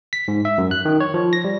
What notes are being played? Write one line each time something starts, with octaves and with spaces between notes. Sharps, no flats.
B6
G#2
E5
F#2
F#6
D#3
C#5
F3
A#6
G3